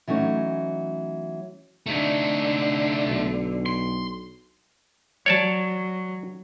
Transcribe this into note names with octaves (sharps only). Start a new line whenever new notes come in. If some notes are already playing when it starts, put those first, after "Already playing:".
E3 F#3 A3 C#4 D#4
D3 A3 D#4
B1
C6
F#3 C#5 D5 A5